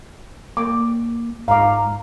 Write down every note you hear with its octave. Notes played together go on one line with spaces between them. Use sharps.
A#3 D6
G#2 F5 A#5 D6